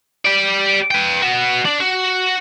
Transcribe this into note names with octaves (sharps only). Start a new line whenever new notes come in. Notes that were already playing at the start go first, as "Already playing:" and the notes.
G4 D5
B4 G5
B3 F#4
D4
F#4